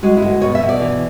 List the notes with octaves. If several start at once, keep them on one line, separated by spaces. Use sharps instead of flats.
G#3 F#4
E4
D2 F#4
B2 C#5
E5
B2
D5
E3